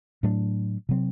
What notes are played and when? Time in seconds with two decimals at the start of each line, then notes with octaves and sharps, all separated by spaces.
0.23 A2 F#3 A3 D4
0.89 C3 F#3 C4